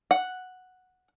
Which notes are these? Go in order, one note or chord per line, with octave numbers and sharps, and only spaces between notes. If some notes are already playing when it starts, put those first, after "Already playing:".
F#5